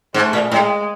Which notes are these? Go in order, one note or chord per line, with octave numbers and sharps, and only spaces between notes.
G#2 A3
A#2
A2 G#3